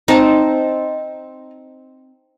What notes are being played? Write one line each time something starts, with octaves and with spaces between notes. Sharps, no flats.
C4 D#4 A5